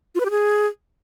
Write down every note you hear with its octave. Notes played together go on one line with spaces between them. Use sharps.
F4
B4
G4
G#4